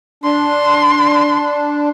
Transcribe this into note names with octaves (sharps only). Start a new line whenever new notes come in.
D4 C6